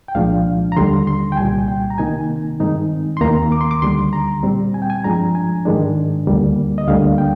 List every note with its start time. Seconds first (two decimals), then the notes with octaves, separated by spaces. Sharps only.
0.08 G5
0.15 C2 A#2 F3 G#3 D4 F5
0.72 A#5
0.77 D#2 D3 G3 C6
1.07 C6
1.32 G5
1.37 C2 A#2 G3 G#5
1.68 G5
1.90 A#5
1.98 C3 D#3 A#3 D#4 G#5
2.60 G2 D#3 G#3 C4 D#4
3.17 C6
3.21 D#2 D#3 A#3 A#5
3.52 D6
3.61 C6
3.71 D6
3.82 D2 D3 G3 C6
4.13 A#5
4.43 A#2 G3 C4
4.74 G#5
4.82 G5
4.90 G#5
5.04 G2 F3 G#3 D4 A#5
5.35 G#5
5.65 G#2 D#3 G#3 D4
6.27 D2 D3 G3 A#3
6.78 D#5
6.88 D2 D3 G3 A#3 D4 F5
7.18 G5